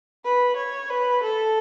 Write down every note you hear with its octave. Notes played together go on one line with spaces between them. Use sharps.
B4
C#5
B4
A4